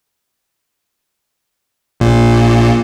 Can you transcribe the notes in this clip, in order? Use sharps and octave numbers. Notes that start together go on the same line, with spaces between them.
A#1 A#2